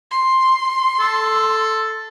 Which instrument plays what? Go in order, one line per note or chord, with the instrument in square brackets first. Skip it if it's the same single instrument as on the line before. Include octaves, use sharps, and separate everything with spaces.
[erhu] C6
[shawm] A4